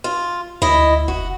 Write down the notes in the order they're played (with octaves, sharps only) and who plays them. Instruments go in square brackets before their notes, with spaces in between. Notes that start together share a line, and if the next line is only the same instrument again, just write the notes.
[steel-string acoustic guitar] F4
[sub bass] D2 [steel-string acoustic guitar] E4 D#5
[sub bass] F1 [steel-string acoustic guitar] F#4